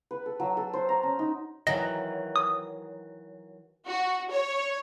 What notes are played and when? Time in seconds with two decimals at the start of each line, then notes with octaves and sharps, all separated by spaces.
0.11 B4
0.26 A4
0.40 F#3
0.57 A4
0.74 C5
0.89 A#5
1.03 C#4
1.19 D#4
1.67 D#3 E3 F#3 D#5
2.36 D#6
3.87 F#4
4.30 C#5